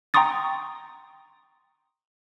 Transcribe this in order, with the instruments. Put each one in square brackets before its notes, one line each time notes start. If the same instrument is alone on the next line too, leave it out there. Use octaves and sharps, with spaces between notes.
[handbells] G5 A#5 C6 C#6 D#6 A6